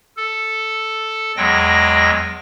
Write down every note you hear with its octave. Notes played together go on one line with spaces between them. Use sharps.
A4
E2 F#3 G#3 G5 A#6